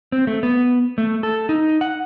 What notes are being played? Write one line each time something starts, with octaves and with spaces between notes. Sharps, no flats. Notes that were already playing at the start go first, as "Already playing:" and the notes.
C4
A3
B3
A3
A4
D#4
F#5